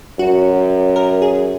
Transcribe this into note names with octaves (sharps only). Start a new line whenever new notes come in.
F#2 F#4
A#4
G#4